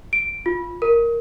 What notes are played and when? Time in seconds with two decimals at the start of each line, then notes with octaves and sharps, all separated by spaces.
0.13 D7
0.46 F4
0.82 A#4